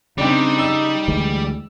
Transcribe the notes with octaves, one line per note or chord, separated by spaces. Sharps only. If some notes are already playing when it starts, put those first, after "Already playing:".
C#3 G3 C4 D4 D#4 G4
E6
D2 E3 G#3